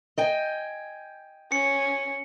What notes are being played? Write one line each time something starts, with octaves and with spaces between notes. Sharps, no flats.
D#5 G5 G#5
C#4 C#7